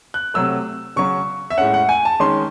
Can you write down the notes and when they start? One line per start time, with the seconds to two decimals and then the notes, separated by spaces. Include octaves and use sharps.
0.14 F#6
0.34 C3 F#3 A3 E6
0.96 C#3 F#3 C#4 C#6
1.50 E5
1.58 A2 G#3 C#4 F#5
1.74 F#5
1.89 G#5
2.05 A5
2.20 D#3 G#3 C#4 C6